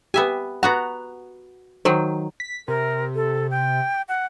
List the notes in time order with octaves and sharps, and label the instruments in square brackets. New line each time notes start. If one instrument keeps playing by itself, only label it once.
[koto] B3 E5 G#5 [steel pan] G4
[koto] B3 F#4 A#5 [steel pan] F#5
[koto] D#3 F#3 [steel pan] C5
[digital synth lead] B6
[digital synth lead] C3 [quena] A#4
[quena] A4
G5
F#5